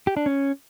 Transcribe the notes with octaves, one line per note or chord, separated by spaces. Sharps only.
G4
D4
C#4